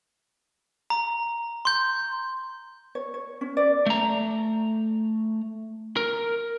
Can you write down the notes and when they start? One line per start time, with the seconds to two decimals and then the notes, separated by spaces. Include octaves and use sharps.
0.90 A#5
1.65 C6 G6
2.95 C#5
3.14 C#5
3.41 C#4
3.57 D5
3.86 A3 A#5
5.97 A#4